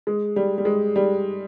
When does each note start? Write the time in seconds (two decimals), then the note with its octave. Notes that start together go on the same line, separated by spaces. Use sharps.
0.07 G#3
0.36 G3
0.58 G3
0.65 G#3
0.96 G3